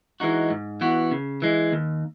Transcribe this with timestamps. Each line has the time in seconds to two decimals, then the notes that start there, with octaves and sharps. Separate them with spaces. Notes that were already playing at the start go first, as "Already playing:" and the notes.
0.20 E3 G#3 D#4 F#4
0.50 G#2
0.81 E3 B3 F#4
1.11 C#3
1.42 E3 G#3
1.72 D#2